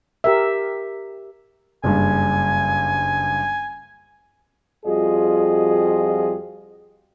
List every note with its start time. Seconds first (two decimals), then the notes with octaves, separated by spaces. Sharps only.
0.24 G4 A#4 E5
1.84 F#1 G2 G#5
4.86 F2 G3 F4 F#4 G#4 D#5